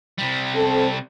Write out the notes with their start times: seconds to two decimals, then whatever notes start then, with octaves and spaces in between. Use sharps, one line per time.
0.18 C3 G3
0.55 C4 A4